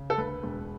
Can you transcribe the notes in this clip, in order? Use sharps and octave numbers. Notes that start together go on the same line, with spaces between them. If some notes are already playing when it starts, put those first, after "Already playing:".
Already playing: C#3
A4
D2 B4
E1